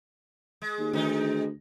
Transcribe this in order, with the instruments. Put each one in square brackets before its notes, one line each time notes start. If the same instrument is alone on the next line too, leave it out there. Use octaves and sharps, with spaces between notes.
[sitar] G#3
[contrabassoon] D#2
[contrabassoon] D2 [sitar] D#3 G#3 D#4